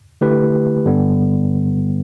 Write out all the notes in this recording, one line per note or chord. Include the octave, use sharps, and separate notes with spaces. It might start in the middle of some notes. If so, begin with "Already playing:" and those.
D3 A3 E4 G4 B4
G2 D3 G3 B3